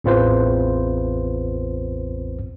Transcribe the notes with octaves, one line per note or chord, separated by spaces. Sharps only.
A1 E2 C4 F4 B4 C5